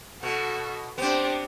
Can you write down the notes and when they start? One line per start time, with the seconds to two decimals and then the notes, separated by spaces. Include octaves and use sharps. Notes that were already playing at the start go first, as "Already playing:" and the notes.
0.23 B2 F#4 A4
0.98 B3 C4 D4 G4 C5